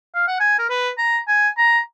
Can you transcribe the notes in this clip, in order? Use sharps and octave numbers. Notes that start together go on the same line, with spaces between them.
F5
F#5
G#5
A#4
B4
A#5
G#5
A#5